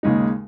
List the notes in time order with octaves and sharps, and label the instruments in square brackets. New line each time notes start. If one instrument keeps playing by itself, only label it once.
[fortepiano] D#2 C#3 G#3 D#4